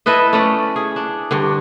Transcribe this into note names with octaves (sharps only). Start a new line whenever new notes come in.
E4 A4 B4 D#5
A3 C#4 D5
G#4
D4
G2 D3